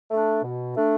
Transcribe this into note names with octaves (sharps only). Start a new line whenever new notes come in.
A3 D4
B2
A3 D4